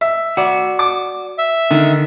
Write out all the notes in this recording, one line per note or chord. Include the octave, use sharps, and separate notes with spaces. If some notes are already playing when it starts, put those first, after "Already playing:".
E5
F#4 D5
D6
E5
D3 D#3